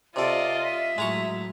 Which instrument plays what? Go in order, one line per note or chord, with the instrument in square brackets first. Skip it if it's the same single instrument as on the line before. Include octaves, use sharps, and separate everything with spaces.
[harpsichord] C3 A4 [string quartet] F4 D#5 [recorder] D5
[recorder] E5
[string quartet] A2 F#3 [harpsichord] G#3 A#5 C#6